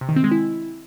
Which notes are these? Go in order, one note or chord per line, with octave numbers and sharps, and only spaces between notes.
C3
D#3
C4
G#3
E4